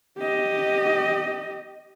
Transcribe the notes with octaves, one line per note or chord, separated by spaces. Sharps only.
G4 D#5